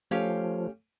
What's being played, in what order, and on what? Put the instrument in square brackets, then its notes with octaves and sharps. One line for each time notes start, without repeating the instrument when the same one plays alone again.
[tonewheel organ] F3 [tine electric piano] A3 A4 C#5 [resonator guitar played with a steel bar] C#4 G4 F5